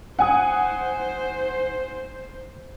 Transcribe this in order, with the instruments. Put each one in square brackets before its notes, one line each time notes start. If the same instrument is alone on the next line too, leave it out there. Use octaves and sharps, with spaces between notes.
[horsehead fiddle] C5 [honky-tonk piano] F#5 G#5 D#6